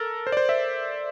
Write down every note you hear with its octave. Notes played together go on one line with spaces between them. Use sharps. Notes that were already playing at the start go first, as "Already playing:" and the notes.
Already playing: A4 A#4
C5
D5
C5
E5